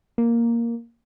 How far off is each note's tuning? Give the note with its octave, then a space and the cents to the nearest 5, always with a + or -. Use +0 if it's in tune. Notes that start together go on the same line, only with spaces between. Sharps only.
A#3 +0